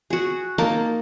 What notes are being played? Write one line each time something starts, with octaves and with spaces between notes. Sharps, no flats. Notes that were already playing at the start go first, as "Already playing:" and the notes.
F#4 G#4
A#3 D#4 A5